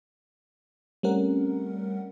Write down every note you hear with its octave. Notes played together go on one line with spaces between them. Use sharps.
G3 A3 C4 C#4 A#4 F#5